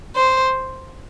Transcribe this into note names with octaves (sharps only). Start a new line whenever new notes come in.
C5